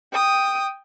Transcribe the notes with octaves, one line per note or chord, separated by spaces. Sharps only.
G5 D#6